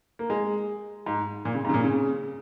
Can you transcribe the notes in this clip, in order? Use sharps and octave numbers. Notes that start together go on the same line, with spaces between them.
A#3
G#3
G#2
A#2
C#3
G#2
C#3
A#2
C#3